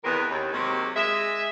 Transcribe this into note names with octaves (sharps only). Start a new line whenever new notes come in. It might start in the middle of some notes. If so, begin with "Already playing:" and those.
E2 C3 D#3 A#4 B4
D#2
C3 D#3 F#3 G#3 A#3
G#3 E5